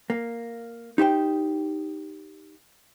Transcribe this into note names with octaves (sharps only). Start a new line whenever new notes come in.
A#3
D#4 G4 C5 G5